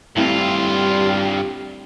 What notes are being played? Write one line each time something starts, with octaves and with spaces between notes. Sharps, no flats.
G2 G3 A3 C4 E4 F4